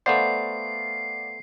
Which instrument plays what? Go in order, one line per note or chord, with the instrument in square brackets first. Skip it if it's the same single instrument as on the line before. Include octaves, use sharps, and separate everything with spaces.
[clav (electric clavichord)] A3 B3 C5 [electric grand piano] D5 F5 F#5 [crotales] C7